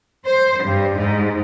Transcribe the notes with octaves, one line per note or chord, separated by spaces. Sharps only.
C5
G2
G#2